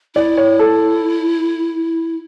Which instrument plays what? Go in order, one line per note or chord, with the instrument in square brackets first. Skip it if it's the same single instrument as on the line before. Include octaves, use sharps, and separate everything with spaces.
[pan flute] E4 [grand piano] D5
[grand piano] C#5
A4